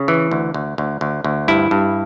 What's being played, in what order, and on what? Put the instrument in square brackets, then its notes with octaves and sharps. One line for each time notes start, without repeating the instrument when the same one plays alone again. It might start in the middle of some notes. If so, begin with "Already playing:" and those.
Already playing: [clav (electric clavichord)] C#3
E3
D2
D2
D2
D2
D2
G2 E4
G2